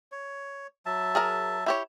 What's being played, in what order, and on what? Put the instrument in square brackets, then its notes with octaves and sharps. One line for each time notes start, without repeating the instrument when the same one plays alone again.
[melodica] C#5
F#3 E5 A5
[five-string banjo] G#4 A#4 A#5
E4 G4 C#5